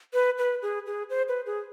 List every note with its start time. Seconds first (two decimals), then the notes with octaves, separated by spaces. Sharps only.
0.14 B4
0.38 B4
0.62 G#4
0.86 G#4
1.10 C5
1.28 B4
1.46 G#4